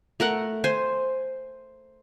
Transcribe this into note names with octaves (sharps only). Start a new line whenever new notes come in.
A3 A#4 F#5
C5 G#5